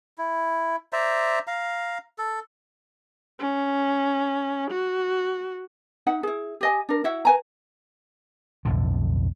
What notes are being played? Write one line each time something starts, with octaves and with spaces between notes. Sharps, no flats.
E4
C5 D5 E5 A#5
F5 A#5
A4
C#4
F#4
D#4 E5 F#5
E4 G#4
G4 D#5 G#5
D4 A#4
E4 F#4 E5 F#5
B4 G#5 A#5
B1 F2 A2 D3